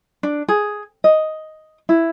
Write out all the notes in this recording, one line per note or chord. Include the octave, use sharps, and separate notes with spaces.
D4
G#4
D#5
E4